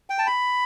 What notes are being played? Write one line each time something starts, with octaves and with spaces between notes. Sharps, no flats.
G5
A5
B5